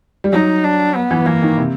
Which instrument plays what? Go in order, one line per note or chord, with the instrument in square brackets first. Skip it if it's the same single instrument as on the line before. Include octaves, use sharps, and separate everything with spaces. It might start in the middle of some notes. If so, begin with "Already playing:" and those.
[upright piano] G3
[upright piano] F#3 [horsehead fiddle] D#4
[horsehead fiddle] D4
B3
[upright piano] E3
[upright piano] E3 [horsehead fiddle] A#3
[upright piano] D#3
C3